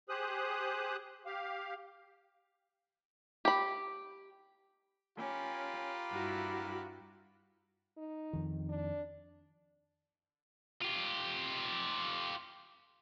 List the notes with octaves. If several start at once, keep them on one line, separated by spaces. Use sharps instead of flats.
G4 G#4 C5 D#6 F#6
G4 F5
G4 B5
C#4 F4 G4 A#4 B5
G2 E4 F#4
D#4
F2 D#3
D4
F4 G4